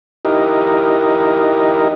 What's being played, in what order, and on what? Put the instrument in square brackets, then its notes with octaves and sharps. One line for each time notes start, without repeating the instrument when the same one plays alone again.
[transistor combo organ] D#4 E4 G4 A#4 D#5